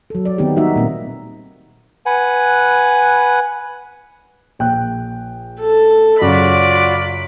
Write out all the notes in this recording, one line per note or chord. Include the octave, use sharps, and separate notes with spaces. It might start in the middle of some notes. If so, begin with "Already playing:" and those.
F#3 A4
D5
D#3 B3 C4 D#4 G4
G3 A#3 D#4 F#4 E5
A#2 A#3 C4
B4 F#5 G#5
A#1 G5 F#6
A4
F#2 C#3 F4 F#4 D5 B5